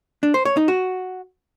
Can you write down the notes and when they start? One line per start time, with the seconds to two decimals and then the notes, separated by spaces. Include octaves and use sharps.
0.23 D4
0.34 C5
0.45 C#5
0.57 D#4
0.68 F#4